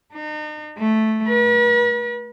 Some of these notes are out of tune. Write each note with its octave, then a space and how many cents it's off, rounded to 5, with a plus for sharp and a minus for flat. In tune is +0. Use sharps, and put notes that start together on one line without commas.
D#4 -40
A3 -5
B4 -45